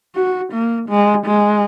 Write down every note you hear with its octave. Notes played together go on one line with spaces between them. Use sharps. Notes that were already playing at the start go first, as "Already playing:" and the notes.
F#4
A#3
G#3
G#3